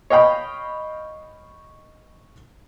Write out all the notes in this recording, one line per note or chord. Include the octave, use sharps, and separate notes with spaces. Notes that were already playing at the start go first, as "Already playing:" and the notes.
C#5 D#5 F5 G5 B5